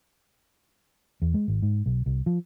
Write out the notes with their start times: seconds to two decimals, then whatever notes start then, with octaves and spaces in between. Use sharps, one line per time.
1.22 E2
1.34 G#3
1.48 G#1
1.62 G#2
1.86 B1
2.06 C2
2.26 F3